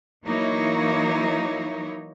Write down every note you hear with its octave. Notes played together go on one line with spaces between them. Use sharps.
E3 F#3 A#3 D#4 E4 C#5